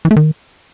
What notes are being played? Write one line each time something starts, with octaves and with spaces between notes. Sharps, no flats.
E3
A3
D#3